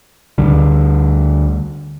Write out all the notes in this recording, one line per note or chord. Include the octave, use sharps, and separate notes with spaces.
D2 D3 G3